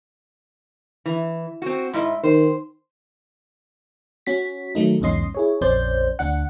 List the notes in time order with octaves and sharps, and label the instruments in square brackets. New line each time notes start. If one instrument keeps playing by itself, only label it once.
[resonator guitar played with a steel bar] E3
C4 F#4
G#2 E4 D#5
[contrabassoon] D#3 [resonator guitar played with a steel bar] C5
[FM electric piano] C#4 F#4 B6
D#3 F#3 A3 D#4
B1 E2 G#2 C#4 D#5 C6
E4 G#4 C#5
A#1 F2 C#4 C5 D5 G6
D2 D4 F#5